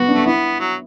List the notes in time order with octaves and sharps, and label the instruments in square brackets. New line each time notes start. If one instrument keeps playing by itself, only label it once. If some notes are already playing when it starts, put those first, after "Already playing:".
Already playing: [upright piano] B3 [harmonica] F#4
[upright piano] D4
[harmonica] A3
[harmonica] B3 [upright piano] E4
[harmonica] F#3